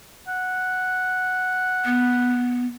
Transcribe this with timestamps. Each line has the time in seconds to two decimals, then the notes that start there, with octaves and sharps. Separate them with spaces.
0.28 F#5
1.85 B3